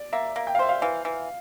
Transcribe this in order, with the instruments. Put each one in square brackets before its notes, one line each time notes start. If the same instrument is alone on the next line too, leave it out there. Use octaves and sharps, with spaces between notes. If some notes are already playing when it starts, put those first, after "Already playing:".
Already playing: [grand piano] D5
[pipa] A#3 [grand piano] E5
[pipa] A#3
[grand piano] G5
F5
[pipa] C5 [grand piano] E5
[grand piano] F5
[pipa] E3 [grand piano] F5
[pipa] E3